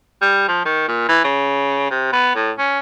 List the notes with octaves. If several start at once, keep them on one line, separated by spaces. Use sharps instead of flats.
G3
F3
D#3
A#2
E3
C#3
C3
B3
A2
C#4